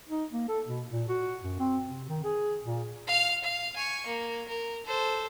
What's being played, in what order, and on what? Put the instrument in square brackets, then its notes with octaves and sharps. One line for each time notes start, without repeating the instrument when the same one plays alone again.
[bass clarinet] D#4
A#3
A4
B2
A#2
F#4
F#2
C4
C3
D#3
G#4
A#2
[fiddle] F5 F6
F5
G#5 C#6
A#3
A#4
A4 C5